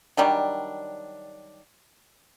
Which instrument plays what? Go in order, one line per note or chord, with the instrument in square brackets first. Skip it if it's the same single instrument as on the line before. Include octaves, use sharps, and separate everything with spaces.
[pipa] D#3 F#3 G3 D4